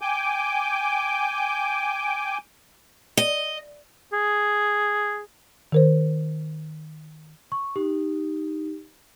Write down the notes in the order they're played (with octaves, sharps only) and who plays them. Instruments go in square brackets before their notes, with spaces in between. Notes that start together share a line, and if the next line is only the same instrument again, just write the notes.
[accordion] G5 G#5 D6 G6
[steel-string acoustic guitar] D#5
[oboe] G#4
[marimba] D#3 A#4 C5
[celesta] C#6
[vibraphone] D#4 [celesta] G4